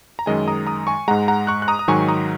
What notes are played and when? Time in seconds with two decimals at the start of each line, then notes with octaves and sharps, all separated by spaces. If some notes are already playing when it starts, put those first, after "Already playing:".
0.19 A#5
0.26 F#2 D#3 G#3 D#5 G#5
0.48 A#5 D#6
0.67 A#5 D#6
0.87 G#5 C#6
1.08 G#2 G#3 F#5 A#5
1.28 F#5 A#5
1.47 C#6 F#6
1.62 F#6
1.68 A#5 D#6
1.79 D#6
1.88 G#2 D#3 F#3 G#5 C#6
2.08 A#5 D#6